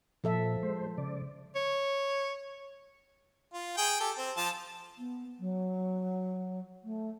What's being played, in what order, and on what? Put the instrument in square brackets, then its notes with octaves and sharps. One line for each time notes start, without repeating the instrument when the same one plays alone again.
[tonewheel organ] A#2 [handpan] F3 A4 E5
[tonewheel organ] G#3 C5
C#3 D5
[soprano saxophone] C#5
[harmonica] F4
G#4 G5
G4 A4
C4
F3 F4 A5
[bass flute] B3
F#3
A3